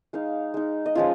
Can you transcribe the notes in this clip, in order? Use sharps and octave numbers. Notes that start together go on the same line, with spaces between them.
G#3 D#4 F5
G#3 D#4
D#5
F3 G#3 C#4 F4 F5